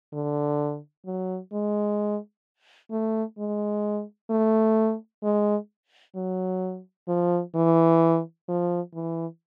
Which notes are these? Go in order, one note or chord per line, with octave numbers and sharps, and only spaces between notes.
D3
F#3
G#3
A3
G#3
A3
G#3
F#3
F3
E3
F3
E3